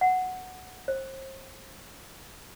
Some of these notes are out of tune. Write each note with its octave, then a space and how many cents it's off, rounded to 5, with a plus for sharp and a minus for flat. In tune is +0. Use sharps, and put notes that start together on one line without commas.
F#5 +0
C5 +35